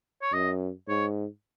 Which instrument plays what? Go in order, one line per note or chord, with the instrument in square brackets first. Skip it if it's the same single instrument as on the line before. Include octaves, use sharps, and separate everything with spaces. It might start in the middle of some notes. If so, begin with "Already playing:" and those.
[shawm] C#5
[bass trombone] F#2 [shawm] D#5
[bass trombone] G#2 [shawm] C#5